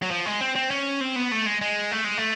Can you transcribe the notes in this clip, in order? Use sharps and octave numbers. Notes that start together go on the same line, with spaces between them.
F#3
F3
G#3
C4
C4
C#4
C4
B3
A3
G#3
G#3
A3
G#3
A3